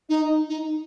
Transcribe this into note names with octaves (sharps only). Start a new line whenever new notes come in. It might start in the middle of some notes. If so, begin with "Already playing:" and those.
D#4
D#4